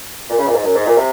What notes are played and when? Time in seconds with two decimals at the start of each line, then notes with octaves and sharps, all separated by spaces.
0.30 A#2
0.38 C#3
0.47 A#2
0.55 G#2
0.63 F#2
0.75 G#2
0.86 A#2
0.97 C3